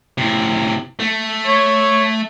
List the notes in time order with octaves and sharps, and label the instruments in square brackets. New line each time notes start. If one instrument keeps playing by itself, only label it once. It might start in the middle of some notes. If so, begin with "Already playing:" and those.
[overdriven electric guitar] A2 C3
A3
[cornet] C#5